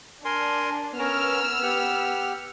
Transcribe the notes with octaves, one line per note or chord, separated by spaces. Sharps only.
D4 A#4 G#5 C6
B3 C#4 A#4 E6 F6
G4 F#5